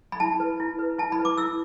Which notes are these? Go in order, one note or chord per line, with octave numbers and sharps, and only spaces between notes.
B5
E4 A5
B4
E4
B4
E4 A5
B5
B4
D6
E4 E6